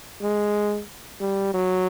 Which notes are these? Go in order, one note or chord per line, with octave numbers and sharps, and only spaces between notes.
G#3
G3
F#3